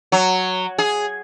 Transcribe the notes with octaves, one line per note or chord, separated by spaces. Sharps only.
F#3
G#4